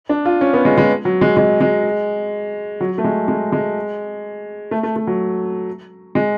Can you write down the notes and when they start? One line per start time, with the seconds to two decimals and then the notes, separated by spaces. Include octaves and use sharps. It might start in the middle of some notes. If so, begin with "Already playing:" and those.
0.09 D4
0.25 F4
0.41 C#4
0.53 B3
0.65 G#3
0.78 G#3
1.05 F#3
1.21 G#3
1.37 G#3
1.61 G#3
2.80 F#3
2.98 A3
3.04 G#3
3.28 G#3
3.52 G#3
4.71 A3
4.83 A3
4.96 A3
5.07 F#3
6.15 G#3